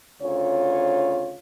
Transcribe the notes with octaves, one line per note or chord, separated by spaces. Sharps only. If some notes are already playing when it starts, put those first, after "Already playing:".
D2 C#3 F4 C#5